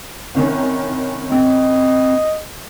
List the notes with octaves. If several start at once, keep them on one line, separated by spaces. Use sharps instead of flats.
C2 D#3 C#4
C4 D#5